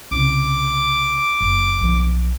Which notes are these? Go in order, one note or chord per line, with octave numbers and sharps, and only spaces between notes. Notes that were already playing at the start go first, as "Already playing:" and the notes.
C2 C#3 D6
F#1
B1 F3